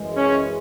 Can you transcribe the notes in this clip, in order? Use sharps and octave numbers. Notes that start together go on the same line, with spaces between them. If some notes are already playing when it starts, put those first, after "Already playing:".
Already playing: F#2 E3 G#3
C#4